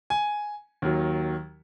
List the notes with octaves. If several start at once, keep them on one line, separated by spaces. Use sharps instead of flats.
G#5
D#2 D#3 F#3